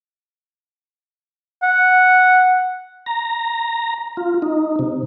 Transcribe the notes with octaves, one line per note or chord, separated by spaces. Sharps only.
F#5
A#5
F4
D#4
C3